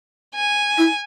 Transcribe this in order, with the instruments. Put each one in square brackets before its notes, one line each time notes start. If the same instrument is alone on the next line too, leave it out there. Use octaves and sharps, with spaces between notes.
[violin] G#5
[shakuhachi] E4